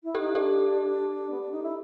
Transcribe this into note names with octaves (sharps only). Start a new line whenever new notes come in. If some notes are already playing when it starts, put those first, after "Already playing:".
E4
G4 A4
D#4
D4 G4 A4
B3
D4
D#4
E4